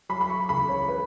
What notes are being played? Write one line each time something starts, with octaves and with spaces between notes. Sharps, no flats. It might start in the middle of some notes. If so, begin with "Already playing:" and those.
F#3 B5
B5
C#6
C#2 B5
C#5
C#3 B4